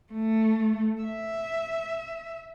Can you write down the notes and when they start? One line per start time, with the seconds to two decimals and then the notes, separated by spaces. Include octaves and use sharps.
0.13 A3
1.02 E5